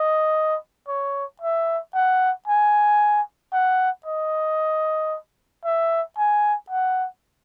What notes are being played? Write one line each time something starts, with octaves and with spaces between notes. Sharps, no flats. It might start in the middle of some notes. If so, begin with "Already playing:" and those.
Already playing: D#5
C#5
E5
F#5
G#5
F#5
D#5
E5
G#5
F#5